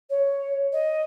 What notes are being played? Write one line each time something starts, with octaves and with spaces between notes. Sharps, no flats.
C#5
D#5